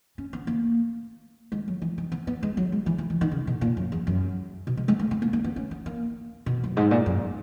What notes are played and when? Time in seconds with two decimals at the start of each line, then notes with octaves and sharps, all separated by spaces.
0.18 C#4
0.33 B3
0.47 A#3
1.52 G#3
1.68 F#3
1.82 E3
1.98 D#3
2.12 B3
2.27 B3
2.43 G#3
2.57 F#3
2.72 G#3
2.86 E3
2.98 E3
3.10 D#3
3.21 D#3
3.31 C#3
3.47 B2
3.61 A#2
3.77 F#2
3.92 E2
4.07 F#2
4.67 B2
4.77 G#3
4.88 G#3
4.99 A#3
5.11 B3
5.22 A#3
5.33 A#3
5.44 B3
5.56 C#4
5.71 B3
5.86 A#3
6.46 B2
6.64 F#2
6.77 G#2
6.91 A#2
7.06 F#2